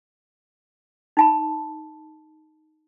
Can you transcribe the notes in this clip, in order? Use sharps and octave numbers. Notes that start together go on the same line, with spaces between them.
D#4 A5 B5